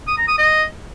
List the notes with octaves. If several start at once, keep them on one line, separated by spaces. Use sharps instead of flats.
D#6
A#5
D#6
D#5